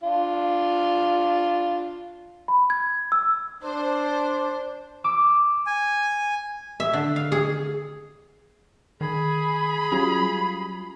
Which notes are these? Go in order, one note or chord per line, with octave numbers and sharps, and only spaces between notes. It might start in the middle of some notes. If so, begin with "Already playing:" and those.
D4 F4
B5
G#6
E6
D4 C5
D6 E6
G#5
E5
D3
F5
G#4
D#3 G#4 B5
F#3 G3 C#4 F4